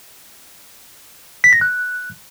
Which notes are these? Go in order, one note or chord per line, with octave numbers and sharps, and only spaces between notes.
B6
A#6
F#6